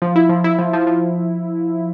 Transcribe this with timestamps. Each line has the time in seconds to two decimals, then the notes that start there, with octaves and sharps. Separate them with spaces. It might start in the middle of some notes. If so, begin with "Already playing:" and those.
0.02 F3
0.16 E4
0.29 F3
0.44 E4
0.59 F3
0.73 F3
0.87 F3